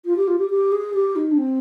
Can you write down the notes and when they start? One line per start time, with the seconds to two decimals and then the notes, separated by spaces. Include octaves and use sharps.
0.06 F4
0.16 G4
0.28 F4
0.38 G4
0.50 G4
0.72 G#4
0.94 G4
1.16 D#4
1.31 D4
1.38 C4